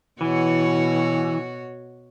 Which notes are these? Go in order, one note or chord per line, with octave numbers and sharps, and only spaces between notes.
B2 E3 F#4 C#5